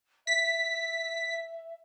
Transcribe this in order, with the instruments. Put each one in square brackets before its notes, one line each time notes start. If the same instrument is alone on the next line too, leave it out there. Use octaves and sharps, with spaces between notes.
[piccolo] E5 [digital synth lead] B6